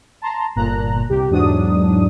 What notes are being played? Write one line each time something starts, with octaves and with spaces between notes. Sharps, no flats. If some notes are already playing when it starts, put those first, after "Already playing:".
A5 A#5 C6
G1 A#2 A#5 F#6
C2 G4
E2 G#2 F#3 D4 D#6